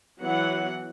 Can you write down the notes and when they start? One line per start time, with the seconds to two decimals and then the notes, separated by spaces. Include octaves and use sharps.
0.23 E3 F#3 B3 F#5